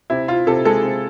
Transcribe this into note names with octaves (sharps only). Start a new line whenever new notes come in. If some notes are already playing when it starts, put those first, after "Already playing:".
C3 E4
C3 F4
C3 A4
G#3 A4
C3